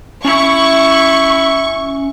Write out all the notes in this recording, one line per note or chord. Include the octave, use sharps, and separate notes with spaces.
C#4 E4 C#6